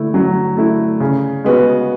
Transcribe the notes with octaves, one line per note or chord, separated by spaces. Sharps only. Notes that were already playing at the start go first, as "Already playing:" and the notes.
Already playing: D3 A3 E4
F#3
A3 E4
C#3
G#3 B3 F#4